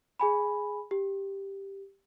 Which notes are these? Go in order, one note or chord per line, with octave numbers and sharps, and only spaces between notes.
G#4 G#5 B5
G4